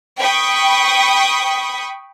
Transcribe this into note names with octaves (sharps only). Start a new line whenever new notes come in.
G5 B5 C#6 D#6